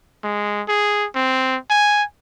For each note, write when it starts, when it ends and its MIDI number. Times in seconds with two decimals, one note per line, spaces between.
0.24 0.62 56
0.68 1.06 68
1.15 1.57 60
1.70 2.03 80